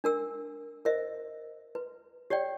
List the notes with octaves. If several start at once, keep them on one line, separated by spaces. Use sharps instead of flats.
D4 A#4 E6
A#4 C5 D#5 E5
B4
G4 C#5 D5 G5